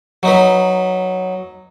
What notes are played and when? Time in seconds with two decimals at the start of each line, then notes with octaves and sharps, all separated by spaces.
0.23 F#3 D#4 B4